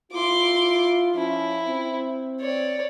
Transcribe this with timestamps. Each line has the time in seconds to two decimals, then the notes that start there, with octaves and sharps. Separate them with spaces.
0.12 E4 F4 C6 D6
1.15 F3 C#4 E4
1.66 C4
2.40 C#5 D5